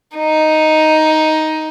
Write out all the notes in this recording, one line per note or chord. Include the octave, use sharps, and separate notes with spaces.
D#4